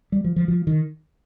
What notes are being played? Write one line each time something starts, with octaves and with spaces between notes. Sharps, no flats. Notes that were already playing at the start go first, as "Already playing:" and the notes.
G3
F3
F3
F3
D#3